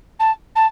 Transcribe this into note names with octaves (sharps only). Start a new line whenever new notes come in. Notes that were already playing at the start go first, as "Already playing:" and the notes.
A5
A5